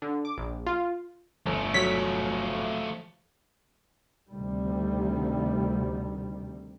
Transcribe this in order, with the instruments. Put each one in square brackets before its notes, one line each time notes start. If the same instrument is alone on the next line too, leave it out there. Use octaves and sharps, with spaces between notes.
[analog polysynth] D3
D6
A#1
F4
[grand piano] G1 [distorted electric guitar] F3 A3
[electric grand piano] F#3 C#5 [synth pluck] B6
[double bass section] D2 C3 D#3 G3